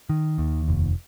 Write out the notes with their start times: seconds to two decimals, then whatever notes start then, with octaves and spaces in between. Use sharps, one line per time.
0.10 D#3
0.38 D#2
0.68 F1